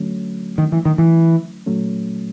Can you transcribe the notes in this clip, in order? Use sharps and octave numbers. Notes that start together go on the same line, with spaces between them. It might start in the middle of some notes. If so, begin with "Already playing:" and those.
Already playing: D3 F#3 A3 C#4
D#3
E3
D#3
E3
A#2 F#3 A3 C#4